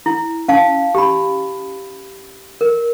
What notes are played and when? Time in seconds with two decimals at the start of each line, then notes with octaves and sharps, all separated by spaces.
0.06 E4
0.48 C#4 F5 A5
0.95 G4 B5
2.61 A#4